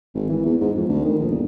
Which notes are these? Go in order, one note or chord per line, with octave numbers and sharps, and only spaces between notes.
G#1
E3
E2
G#2
F2
D2
D#3
A#1
G1